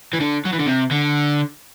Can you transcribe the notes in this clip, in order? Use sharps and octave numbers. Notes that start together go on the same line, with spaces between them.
E3
D3
F#3
E3
D3
C3
D3